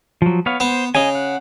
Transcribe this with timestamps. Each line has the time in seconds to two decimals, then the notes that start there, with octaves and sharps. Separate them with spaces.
0.22 F3 F#3
0.46 B3 C#5 F5
0.60 B3 C5
0.95 C#3 D#5 G#5
1.15 F#5